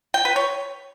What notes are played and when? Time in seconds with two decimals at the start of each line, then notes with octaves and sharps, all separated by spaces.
0.14 G5
0.25 B4
0.36 C#5